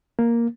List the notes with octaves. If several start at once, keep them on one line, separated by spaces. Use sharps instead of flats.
A#3